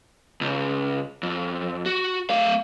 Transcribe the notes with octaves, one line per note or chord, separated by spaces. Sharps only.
C#2
F2
F#4
A3 F5